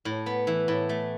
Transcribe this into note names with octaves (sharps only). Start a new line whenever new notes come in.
A2
B3
E3
A2
A3